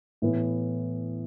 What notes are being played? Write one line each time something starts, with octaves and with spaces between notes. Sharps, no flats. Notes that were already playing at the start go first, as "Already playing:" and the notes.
A2 E3 B3